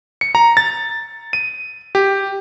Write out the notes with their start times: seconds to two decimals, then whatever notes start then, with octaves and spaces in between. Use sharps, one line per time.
0.21 C#7
0.35 A#5
0.57 A6
1.33 D#7
1.95 G4